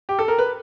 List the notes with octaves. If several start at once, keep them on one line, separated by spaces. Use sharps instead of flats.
G4
A4
A#4
B4